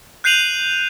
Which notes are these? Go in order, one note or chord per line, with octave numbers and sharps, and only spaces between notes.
F#6 G6 C7 D#7 F7 F#7